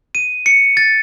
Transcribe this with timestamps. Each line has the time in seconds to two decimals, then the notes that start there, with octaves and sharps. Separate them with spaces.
0.15 D#7
0.46 C#7
0.77 A6